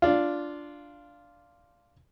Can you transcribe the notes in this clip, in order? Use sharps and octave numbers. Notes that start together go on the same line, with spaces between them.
D4 F4